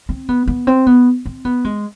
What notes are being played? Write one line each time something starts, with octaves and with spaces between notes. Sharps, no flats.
C4
B3
B3
C4
B3
C4
B3
G#3